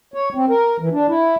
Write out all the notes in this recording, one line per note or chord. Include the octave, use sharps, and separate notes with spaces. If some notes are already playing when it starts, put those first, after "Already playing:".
C#5
C4
A#4
E3
D4
E4